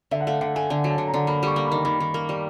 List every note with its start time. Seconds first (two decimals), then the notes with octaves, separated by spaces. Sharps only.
0.11 D3 E5
0.20 F#5
0.26 A3 F5
0.41 D3 F#5
0.55 A3 G#5
0.70 D3 G#5
0.84 F#3 A5
0.98 D3
1.08 A#5
1.14 D3
1.27 A#3 B5
1.43 G3 C#6
1.56 A#3
1.67 D#3 B5
1.85 D#3 B5
2.00 D#3
2.14 A#3
2.29 G3